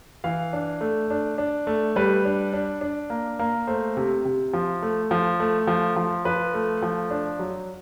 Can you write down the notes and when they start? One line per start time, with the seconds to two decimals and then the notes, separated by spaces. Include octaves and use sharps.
0.24 E3 F5
0.53 D4
0.81 A3
1.10 D4
1.38 D4
1.67 A3
1.96 G3 B4
2.25 D4
2.53 D4
2.81 D4
3.10 A#3
3.39 A#3
3.67 A3 C5
3.97 C3
4.25 C3
4.53 F3
4.82 A3
5.11 F3
5.40 A3
5.67 F3
5.96 F3
6.25 F3 B4
6.54 A3
6.82 F3
7.11 D4
7.39 F#3